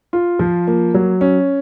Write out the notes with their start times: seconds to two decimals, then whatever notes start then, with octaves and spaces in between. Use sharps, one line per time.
0.13 F4
0.39 F3
0.67 A#3
0.94 F#3
1.21 C#4